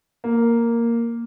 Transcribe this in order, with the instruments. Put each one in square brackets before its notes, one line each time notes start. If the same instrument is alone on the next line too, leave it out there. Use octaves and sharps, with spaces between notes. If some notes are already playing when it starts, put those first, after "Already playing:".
[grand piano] A#3